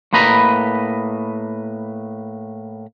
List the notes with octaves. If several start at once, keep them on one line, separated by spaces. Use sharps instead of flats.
A2 A#3 B4 D#5 A#5 B5